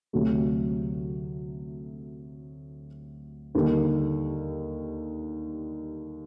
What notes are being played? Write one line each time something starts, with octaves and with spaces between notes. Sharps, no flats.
D2 C3 F#3 A3
D#2 D3 G3 A#3